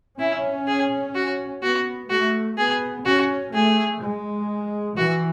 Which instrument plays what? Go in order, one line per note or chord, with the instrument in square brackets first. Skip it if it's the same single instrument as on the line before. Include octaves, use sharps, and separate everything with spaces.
[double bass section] C#4 [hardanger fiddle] E4
[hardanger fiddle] G#4
F#4
[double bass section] B3 [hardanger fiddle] F#4
[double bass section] A3 [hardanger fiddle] F#4
[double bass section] B3 [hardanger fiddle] G#4
[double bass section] C#4 [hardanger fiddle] F#4
[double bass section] A3 [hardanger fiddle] G#4
[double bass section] G#3
[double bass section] E3 [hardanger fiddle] F#4